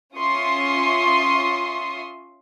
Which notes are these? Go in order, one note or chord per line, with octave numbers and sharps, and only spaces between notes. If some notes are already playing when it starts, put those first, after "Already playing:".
C#4 F4 E5 C6 C#6 D#6